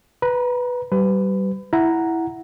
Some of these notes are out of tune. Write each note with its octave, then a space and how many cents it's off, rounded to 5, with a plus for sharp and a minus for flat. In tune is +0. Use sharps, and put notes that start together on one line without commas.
B4 +0 A#5 +30
G3 -25 B4 +25
E4 +0 F#5 +0 A#5 +0